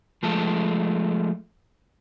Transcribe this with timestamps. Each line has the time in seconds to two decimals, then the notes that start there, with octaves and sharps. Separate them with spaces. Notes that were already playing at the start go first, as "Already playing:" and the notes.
0.23 F3 G#3 A3 A5